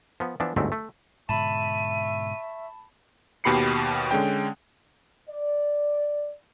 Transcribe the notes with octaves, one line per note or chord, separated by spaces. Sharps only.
F3 B3
E3 F3 B3 D4
G1 D2 G#2 F#3 A3 C4
A3
G#2 B2 D3 E5 A5 B5 C#6 D#7
D#2 B2 G4 B5 C7 C#7
D3 G#3 C#4 G5
D5